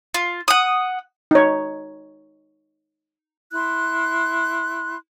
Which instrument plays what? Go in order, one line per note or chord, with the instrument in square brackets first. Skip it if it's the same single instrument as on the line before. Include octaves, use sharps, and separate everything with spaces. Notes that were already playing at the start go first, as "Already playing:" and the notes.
[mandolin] F4
F#5 D#6
[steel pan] D#4 C#5
[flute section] E4 C6 F#6